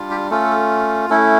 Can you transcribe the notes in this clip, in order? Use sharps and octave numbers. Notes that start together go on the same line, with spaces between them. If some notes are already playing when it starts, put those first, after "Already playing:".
Already playing: G3 D4 F4
G4
A3 C#4 F4 A4
A3 C#4 E4 A4